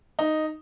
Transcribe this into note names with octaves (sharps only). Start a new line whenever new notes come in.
D#4